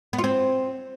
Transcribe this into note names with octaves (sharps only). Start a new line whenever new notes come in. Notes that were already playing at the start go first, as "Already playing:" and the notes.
B3
F4
C4